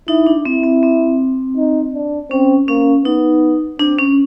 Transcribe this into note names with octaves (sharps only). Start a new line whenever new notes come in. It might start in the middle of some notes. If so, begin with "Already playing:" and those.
D#4 E4
D4
C4 E4
C4
C4
D#4
D4
C4 C#4
A#3 C#4
B3 D#4
C4 D4
C#4